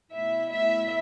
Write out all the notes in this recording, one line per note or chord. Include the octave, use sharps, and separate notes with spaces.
B2 A3 E4 E5
E5